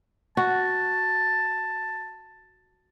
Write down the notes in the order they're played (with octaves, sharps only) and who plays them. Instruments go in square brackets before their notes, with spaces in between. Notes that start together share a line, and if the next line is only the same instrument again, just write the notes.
[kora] F#4 [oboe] A5